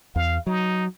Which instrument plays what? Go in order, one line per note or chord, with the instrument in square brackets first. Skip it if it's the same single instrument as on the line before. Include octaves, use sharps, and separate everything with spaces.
[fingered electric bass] E2 [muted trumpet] F5
[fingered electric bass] F#3 [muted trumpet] D#4